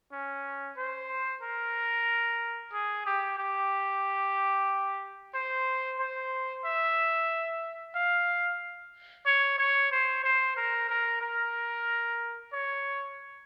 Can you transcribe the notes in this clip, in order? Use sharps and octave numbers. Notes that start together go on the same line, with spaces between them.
C#4
C5
A#4
G#4
G4
G4
C5
C5
E5
F5
C#5
C#5
C5
C5
A#4
A#4
A#4
C#5